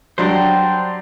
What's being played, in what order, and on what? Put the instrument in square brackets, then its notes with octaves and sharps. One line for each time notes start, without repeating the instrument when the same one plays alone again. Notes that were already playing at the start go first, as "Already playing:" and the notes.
[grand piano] F#3 G3 D4 [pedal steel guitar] C5 G5